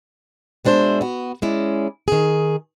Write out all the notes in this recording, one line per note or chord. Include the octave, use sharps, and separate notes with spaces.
B2 G#3 D4 B4 C5 E5
B3 F#4
G#3 C#4 E4 D5
D#3 G#4